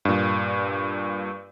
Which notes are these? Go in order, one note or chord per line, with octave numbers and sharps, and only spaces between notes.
G2 A#2